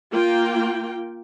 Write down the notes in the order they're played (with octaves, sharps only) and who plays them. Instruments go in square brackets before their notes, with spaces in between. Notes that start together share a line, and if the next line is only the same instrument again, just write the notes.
[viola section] A#3 F4 G5